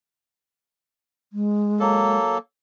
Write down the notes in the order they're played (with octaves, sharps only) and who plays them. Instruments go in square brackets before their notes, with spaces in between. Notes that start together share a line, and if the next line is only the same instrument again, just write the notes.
[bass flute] G#3
[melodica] F#3 A#3 A4